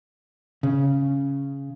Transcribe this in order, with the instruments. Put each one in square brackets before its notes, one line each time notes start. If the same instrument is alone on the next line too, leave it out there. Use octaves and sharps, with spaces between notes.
[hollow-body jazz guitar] C#3